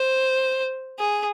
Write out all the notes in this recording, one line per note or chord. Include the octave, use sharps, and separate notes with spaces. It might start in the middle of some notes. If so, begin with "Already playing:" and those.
Already playing: C5
G#4